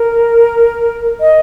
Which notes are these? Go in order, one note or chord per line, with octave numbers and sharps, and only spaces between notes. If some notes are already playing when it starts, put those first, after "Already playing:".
Already playing: A#4
D#5